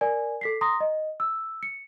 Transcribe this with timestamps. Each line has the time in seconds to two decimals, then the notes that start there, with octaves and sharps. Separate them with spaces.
0.01 A#4 D5 G#5
0.41 A4 B6 C7
0.61 A#5 C6 D#6 A#6
0.80 D#5
1.20 E6
1.63 C#7